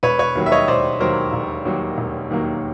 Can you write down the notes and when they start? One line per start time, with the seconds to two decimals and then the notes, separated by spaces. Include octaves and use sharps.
0.03 E1 B4 C#5
0.19 B4 C#5
0.36 D#2 D#3 F#3 A#3
0.46 E5
0.52 C#5 D#5
0.68 E1 C5 D5
1.00 D#2 D#3 F#3 A#3 A#4 C5
1.33 E1
1.65 D#2 D#3 F#3 A#3
1.98 E1
2.30 D#2 D#3 F#3 A#3